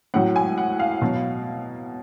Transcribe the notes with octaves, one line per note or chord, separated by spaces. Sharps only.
A2 F#3 F#5
G#5
F#5
F5
B2 F#3